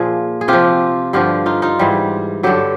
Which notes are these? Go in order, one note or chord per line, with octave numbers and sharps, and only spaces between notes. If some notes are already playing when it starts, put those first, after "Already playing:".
Already playing: A#2 F3 G#4
G#4
C3 F3 F4 G4
G2 D3 F3 F4 G4
D#4 F4
D#4 F4
G#2 E3 G3
G2 D3 F#3 G4 A4